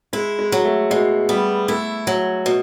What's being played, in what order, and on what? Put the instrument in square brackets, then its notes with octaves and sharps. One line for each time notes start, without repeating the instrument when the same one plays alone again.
[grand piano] G#3 [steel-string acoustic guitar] E4
[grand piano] G#3
[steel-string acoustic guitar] F#3
[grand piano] A3
[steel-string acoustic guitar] B2 [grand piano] G#3
[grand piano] G3 [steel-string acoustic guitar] B3
[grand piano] A3 [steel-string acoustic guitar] E4
[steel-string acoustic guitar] F#3
B2